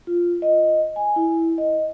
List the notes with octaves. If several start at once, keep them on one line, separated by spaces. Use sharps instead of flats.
F4
D#5
G#5
E4
D#5